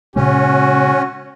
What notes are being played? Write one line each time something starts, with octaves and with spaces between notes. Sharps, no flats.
A#2 C#3 G#3 C#4 F#4